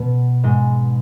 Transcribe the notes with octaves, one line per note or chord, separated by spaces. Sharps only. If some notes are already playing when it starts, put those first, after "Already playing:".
Already playing: B2 B3
G#2 G#3